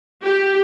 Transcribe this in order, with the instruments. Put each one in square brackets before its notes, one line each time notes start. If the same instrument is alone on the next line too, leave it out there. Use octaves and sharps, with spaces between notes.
[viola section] G4